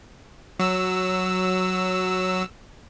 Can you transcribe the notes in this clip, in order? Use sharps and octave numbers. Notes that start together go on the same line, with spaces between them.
F#3 E6